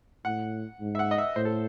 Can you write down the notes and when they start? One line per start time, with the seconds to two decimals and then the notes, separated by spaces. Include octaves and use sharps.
0.25 A2 F#5
0.80 G#2
0.95 E5
0.99 F#5
1.11 D#5
1.18 E5
1.36 A2 C5
1.45 A4